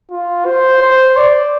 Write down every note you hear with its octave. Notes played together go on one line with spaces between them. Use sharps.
F4
C5
C5
D5